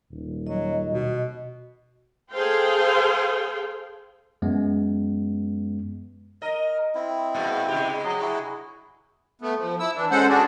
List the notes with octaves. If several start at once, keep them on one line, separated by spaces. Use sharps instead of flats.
D#1
F#3 D#5
B2
G#4 A4 C5 F5 G5
F#2 G#3 B3
A#4 D#5
C4 E4
A#2 G#3 B3
C3 G#3 G4
F#3 D#5
E4 F#4 G#4
A3 B3
F3
E4 E6
E3 D4
G#3 C#4 A4 C5 F#5
D4 F#4 G#4 D5